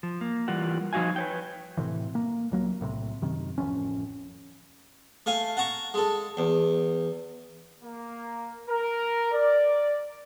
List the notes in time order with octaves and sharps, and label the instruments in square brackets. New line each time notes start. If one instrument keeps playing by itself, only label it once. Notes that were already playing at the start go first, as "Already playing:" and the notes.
[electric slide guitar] F3
A#3
E3 G3 F4 A#4 F#5
F3 D#4 F#4 F5 G#5
B4 C#5 G5
[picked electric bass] A2 C3 E3
A#3
C#2 F#3 A#3
B1 A2 C3
F#2 C3 D#3
D1 A1 F2 C#4
[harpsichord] A3 F5 G#5
F#5 A5 A#5 C#6
G#3 A4
E2
[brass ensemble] A#3
A#4
D5